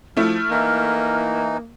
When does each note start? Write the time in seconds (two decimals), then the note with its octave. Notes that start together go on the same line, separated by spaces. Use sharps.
0.17 F3 A3 E4 F6
0.51 E3 A#3 D#4